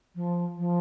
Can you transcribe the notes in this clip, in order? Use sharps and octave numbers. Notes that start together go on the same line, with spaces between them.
F3
F3